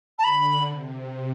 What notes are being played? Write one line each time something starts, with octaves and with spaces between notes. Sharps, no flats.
A5
D3 B5
C3